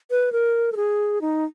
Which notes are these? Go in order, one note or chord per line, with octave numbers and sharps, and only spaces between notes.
B4
A#4
A4
G#4
D#4